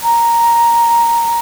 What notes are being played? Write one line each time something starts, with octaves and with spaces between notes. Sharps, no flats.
A#5